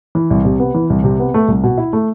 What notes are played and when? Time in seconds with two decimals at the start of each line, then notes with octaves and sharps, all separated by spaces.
0.15 E3
0.30 C2
0.45 C3
0.60 B3
0.75 E3
0.90 C2
1.04 C3
1.19 B3
1.34 A3
1.48 C2
1.64 B2
1.78 E4
1.93 A3